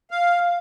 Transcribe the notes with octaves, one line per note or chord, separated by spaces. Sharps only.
F5